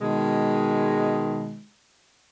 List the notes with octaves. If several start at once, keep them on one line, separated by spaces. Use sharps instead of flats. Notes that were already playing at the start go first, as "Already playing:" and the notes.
B2 D#3 G#3